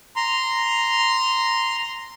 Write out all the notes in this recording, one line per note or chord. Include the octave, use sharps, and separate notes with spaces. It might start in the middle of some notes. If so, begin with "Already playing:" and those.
A#5 C6